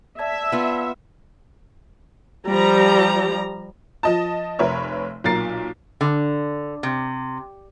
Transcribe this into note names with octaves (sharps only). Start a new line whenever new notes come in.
D5 E5 A5 G#6
B3 F4
F3 G3 A#5
F3 D#5 A5
F1 A#4 B4 C#5 E5
B1 A#2 A#4 A6 C7
D3
C3